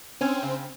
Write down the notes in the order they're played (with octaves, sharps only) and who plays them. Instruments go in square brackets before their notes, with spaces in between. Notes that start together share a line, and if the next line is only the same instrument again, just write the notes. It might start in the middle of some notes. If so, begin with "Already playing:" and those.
[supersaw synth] C4 [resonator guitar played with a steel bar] C#4
[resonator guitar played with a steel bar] C#3